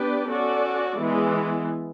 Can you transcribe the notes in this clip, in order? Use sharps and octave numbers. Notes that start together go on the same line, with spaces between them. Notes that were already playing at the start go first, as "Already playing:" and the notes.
Already playing: B3 D4 G4 B4 D5
C#4 F#4 A4 D5
E3 G#3 B3